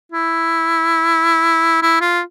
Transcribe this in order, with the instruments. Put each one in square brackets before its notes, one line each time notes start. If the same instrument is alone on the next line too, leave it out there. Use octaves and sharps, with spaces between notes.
[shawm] E4
E4
F4